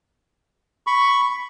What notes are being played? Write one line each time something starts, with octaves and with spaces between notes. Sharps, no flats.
B5 C#6